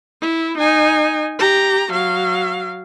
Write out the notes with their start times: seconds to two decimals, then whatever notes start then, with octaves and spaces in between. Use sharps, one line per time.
0.22 E4
0.58 D#4 G#5
1.39 G4 A#5
1.91 F#3 F5